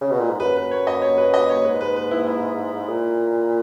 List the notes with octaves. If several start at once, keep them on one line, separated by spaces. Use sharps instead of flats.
C#3
B2
A#2
G#2
F#2 B4
B4
C#5
D#5
C#5
B4
D#5
C#5
G#2 B4
B4
B4
E4
E4
A#2